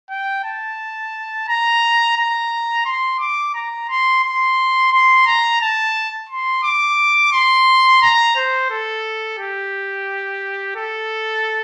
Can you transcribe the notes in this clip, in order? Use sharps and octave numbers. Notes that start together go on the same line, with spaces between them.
G5
A5
A#5
A#5
C6
D6
A#5
C6
C6
C6
A#5
A5
C6
D6
C6
A#5
C5
A4
G4
A4